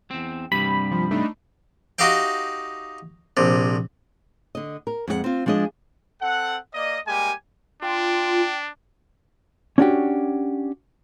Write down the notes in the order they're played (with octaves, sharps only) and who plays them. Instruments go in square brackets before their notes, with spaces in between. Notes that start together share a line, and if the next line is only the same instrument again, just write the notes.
[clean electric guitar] E2 C4
[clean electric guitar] G2 C3 G3 [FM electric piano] B5
[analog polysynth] F3
A3 D4 D#4
[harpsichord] D#4 F#4 G4 E5 F5 G5
A#1 C3
[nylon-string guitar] D3 D#5
A#4
F2 G#3 F#4 F#5
C4 F4
F3 G#3 D4 G#4 D#5
[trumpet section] C4 A4 F#5
A#3 D5 D#5
G3 G#3 A#3 G4 G#5
[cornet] D4 [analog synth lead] F4 [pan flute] G5
[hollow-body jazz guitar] C#4 D4 F#4 G4